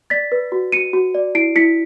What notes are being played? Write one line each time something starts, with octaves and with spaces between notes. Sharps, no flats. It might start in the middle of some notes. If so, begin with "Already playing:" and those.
D5 A6 B6
B4
F#4
F#4 C#7 D#7
F#4
D5
E4 C7 D7
E4 B6 C#7